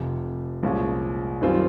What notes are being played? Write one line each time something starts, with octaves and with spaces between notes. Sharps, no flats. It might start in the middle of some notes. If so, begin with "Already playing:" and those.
Already playing: F1 F2 C3
C2 A#2 F3 G#3 C#4
F#2 D#3 G3 C4 F4